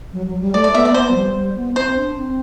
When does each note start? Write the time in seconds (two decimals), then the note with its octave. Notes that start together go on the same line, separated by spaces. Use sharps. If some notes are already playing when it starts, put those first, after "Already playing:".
0.13 F#3
0.27 F#3
0.41 G3
0.54 A3 D5
0.64 D5
0.74 B3 E5
0.85 D5
0.94 B3 C5
1.11 F#3
1.16 G3
1.35 G3
1.57 B3
1.76 C4 C5
1.96 D4
2.18 C4